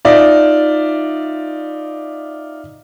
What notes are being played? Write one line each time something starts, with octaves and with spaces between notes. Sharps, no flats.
D#4 F4 D5 E5